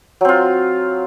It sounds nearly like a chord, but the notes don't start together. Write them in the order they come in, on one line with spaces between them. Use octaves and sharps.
F#3 C4 F4